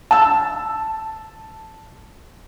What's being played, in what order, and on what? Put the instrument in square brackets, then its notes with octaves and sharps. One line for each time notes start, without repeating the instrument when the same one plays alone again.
[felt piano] A5 E6